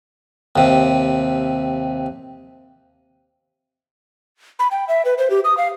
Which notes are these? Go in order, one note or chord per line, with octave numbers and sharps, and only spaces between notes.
D#2 C3
B5
G5
E5
B4
C5
G4
D#6
F5